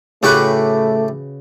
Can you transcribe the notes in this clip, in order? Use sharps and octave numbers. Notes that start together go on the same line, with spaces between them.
A2 C#3 A3 F#4 G4 B4 C#6